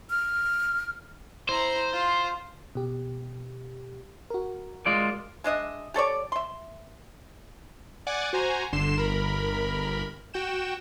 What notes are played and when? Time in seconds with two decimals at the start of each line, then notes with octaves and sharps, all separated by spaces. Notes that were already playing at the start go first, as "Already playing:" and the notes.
0.10 F6
1.49 E4 C5 A#5
1.93 F4
2.75 B2 G4
4.30 F#4 A#4
4.86 G#3 F4 D5
5.44 G#3 D4 D#5 E5
5.94 G4 A4 C#5 D5
6.32 E5 C6
8.07 D5 F#5 G#5 D6
8.33 F#4 C5 G#5 A#5
8.72 G1 D3 C6 C7 E7
8.97 G1 A#4 B5
10.34 F#4 G5 E7